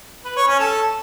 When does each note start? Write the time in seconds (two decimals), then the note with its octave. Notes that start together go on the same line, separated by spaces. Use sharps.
0.25 B4
0.36 C#5
0.48 C#4
0.59 A4